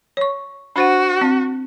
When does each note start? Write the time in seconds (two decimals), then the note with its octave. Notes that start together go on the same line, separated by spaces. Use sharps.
0.17 C#5 C#6
0.76 D4 F#4 C5 F#5
1.21 C4